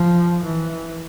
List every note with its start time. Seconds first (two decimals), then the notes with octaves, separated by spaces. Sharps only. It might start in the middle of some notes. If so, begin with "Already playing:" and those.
Already playing: F3
0.43 E3